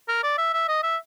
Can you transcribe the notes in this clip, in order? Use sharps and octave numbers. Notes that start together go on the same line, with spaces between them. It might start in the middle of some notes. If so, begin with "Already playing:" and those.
A#4
D5
E5
E5
D#5
E5